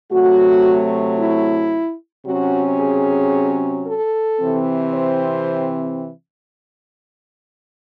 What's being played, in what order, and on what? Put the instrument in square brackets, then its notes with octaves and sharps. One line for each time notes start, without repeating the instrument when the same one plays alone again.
[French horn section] C3 F#3 A3 F#4
E4
C3 F#3 C#4 F#4
G#4
A4
C3 E3 C4
C5